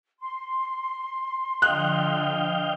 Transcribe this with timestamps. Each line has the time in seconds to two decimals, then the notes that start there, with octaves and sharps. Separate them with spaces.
0.20 C6
1.62 D3 F3 D#5 F5 G5 F#6